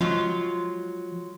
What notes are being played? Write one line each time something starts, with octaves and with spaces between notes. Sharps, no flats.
F3 F#3 G#3 F4